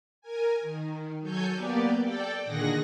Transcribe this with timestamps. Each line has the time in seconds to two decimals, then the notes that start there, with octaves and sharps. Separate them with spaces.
0.21 A#4 G#5
0.61 D#3
1.21 F#3 A4 C#5 G#5 G6
1.53 A#3 B3 G4 D5
2.03 A4 D5 G5
2.45 A#2 D3 D#3 G#4 F#5 A#6